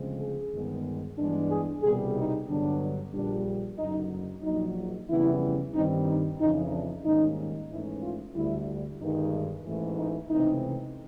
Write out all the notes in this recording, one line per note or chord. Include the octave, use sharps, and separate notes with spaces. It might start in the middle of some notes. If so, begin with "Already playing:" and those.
Already playing: D2 C#3 F3 G#3 C4
G#4
G1 G2 D#3 G#3 B3
G2 E3 G#3 B3 D4
G#4
C2 B2 G3 B3 G#4
D#4
G2 D3 F#3 B3 D4
D4
A#1 A#2 G3 D4
F#1 F#2 D3 F#3 D#4
A#1 A#2 F#3 D#4
F2 C#3 E3 G3 B3 E4
G2 D#3 G3 C4 D#4
D#4
F2 C#3 E3 D#4
D4
G#2 D#3 G3 A#3 C#4 D#4
G#2 E3 A3 C#4 E4
F4
D2 D3 G3 E4
G1 G2 D#3 G#3 D#4
A1 G#2 E3 A3
D#4
C#2 C3 E3 A3 C4 D#4